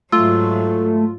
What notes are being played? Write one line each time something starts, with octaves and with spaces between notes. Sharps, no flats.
G#2 F#3 A3 F4 E6